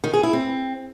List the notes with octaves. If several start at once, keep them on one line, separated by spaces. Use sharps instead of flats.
D#3
G#4
E4
C4